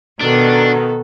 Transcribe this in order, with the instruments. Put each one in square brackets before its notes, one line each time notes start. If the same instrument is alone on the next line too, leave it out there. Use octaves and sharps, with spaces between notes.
[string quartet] B2 D#3 B3 [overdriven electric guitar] D4 [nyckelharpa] F#4 A4